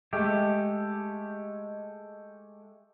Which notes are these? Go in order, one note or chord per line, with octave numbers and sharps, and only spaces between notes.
G#3 A3 G4